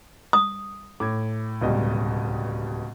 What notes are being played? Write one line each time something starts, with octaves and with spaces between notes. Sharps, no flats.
D#6
A2 D6 G#6
D1 C#2 B2 G3 D#5